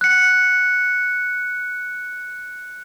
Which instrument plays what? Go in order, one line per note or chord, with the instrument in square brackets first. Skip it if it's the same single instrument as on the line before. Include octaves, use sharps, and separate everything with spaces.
[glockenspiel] F#6 C#7